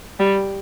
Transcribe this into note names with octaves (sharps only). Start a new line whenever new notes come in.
G3